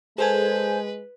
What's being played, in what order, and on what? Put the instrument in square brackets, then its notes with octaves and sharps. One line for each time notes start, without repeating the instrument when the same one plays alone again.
[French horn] G#3 [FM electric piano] G#4 A4 G#5 [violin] B4 [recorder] C5